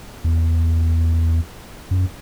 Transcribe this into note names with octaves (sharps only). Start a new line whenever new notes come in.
E2
F#2